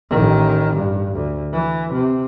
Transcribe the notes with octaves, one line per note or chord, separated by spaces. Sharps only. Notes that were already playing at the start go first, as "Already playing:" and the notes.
A1 D#3
G2
D2
E3
C3